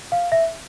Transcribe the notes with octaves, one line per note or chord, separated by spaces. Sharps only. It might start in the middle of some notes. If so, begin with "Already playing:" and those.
F5
E5